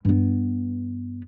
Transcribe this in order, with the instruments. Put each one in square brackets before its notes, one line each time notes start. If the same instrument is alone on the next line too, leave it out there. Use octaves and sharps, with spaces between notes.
[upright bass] G2 B3